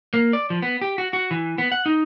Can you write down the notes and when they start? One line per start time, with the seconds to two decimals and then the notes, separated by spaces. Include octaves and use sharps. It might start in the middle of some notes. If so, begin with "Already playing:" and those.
0.14 A#3
0.33 D5
0.50 F3
0.62 B3
0.82 G4
0.98 F#4
1.13 F#4
1.31 E3
1.58 B3
1.72 F#5
1.86 D#4